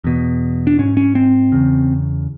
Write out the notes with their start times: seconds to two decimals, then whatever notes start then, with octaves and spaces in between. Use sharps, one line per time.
0.04 E2 B2
0.67 D4
0.78 G#2 C#4
0.97 C#4
1.15 C4
1.52 E2 C#3